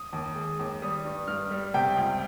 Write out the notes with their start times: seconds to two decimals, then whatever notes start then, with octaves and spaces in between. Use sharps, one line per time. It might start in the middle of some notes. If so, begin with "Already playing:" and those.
Already playing: D#6
0.13 D#2
0.35 G#3
0.59 D#2
0.82 G3 D#6
1.05 G2
1.27 G2 F6
1.51 G3
1.74 C3 G5
1.97 C#2